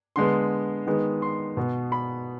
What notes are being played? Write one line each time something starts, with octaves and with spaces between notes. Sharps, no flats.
D3 G#3 B3 C6
D#3 G#3 B3
C6
B2 B3
B5